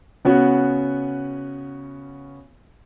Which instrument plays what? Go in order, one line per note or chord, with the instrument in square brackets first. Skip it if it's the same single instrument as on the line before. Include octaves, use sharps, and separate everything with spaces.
[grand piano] C#3 B3 C#4 F#4